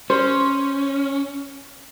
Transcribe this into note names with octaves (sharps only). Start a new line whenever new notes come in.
C#4 C5